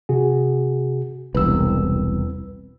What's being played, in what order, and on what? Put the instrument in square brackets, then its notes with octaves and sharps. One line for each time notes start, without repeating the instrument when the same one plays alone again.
[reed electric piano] C3 F#4 G#4
[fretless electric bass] E1 C2 [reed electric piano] B4 E6